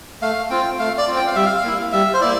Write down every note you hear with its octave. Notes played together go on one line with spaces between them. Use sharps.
A3 F5
C4 F4 G5
A3 F5
D5
C4 F4
G5
F5
G3 E5
F5
A#3 E4
G3 E5
C5
A#3 E4 D5